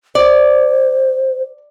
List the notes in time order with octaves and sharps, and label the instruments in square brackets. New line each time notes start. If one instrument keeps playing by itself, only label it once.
[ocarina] C5 [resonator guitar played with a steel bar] D5